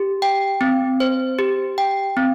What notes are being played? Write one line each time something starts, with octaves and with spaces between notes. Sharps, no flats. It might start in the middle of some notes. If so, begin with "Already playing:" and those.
Already playing: G4
G5
C4
C5
G4
G5
C4